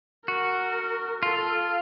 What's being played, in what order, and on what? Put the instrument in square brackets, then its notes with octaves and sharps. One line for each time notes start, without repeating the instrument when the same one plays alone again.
[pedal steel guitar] F#4 [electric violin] A#4
[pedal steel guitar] F4 [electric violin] A4